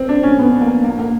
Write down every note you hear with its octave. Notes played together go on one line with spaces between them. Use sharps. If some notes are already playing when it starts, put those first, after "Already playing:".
Already playing: C4
D4
C#4
B3
A#3
A#3
A#3